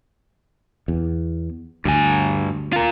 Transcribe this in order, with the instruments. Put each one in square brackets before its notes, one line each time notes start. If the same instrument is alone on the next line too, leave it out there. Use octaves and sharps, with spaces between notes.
[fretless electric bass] E2
[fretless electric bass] D2 [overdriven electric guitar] G2 G#5
[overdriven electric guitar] F4 A#4